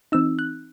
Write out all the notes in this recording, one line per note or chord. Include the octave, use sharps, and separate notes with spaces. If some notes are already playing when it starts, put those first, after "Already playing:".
E3 C4 D#4 E6
F#6